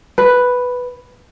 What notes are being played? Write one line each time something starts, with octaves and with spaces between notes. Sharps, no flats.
B4